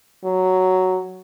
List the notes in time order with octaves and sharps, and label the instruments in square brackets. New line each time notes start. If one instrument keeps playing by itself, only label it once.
[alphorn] F#3